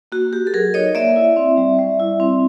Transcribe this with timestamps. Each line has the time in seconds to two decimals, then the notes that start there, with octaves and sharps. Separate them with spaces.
0.12 A#3 F#4
0.33 F#4 G4
0.47 A4
0.53 F#3 G#4 A#4
0.74 D#4 C#5 D#5
0.95 A#3 D5 E5
1.16 E4
1.37 C4
1.57 G3
1.79 G3
2.00 E4
2.20 C4